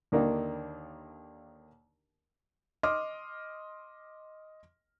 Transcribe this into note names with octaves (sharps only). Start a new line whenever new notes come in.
D#2 D3 D#3 A#3 D4 D#4
D#5 C6 D6 F6